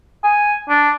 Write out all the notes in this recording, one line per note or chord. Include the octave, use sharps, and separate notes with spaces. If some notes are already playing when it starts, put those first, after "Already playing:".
G#5
D4